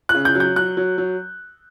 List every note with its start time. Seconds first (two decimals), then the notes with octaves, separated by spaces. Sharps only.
0.09 F#6
0.14 C#3
0.25 G6
0.35 F#3
0.40 G6
0.56 F#3 F#6
0.77 F#3
0.98 F#3